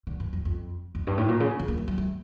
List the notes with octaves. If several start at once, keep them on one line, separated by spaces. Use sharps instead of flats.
D3
G2
F2
F2
F2
G2
A2
A#2
C#3
D3
A#3
A3
G3
A3